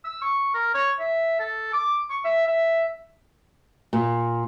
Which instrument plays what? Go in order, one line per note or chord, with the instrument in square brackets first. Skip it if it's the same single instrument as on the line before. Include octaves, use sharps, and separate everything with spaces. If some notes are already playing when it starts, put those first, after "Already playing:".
[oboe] E6
C#6
A#4
C#5
E5
A4
D6
C#6
E5
E5
[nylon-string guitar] A#2